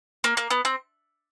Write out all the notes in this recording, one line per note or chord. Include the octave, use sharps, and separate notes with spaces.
A#3
A#3
B3
C4